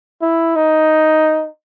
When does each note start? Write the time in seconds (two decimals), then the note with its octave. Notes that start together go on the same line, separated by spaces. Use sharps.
0.22 E4
0.56 D#4